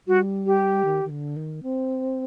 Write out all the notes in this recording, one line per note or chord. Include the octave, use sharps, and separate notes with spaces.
G3 F#4
G4
D#3
D#3
D3
D#3
C4